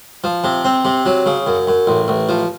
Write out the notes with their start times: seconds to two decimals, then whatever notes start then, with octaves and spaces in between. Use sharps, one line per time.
0.24 F3
0.44 C3
0.64 C4
0.85 C3
1.06 F#3
1.26 C#3
1.47 F#2
1.67 F#2
1.87 A1
2.08 A1
2.29 F3